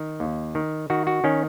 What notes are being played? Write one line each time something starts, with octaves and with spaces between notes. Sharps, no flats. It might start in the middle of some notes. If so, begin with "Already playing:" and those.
Already playing: D#3
D#2
D#3
D#3 F#4
F#4
D#3 C#4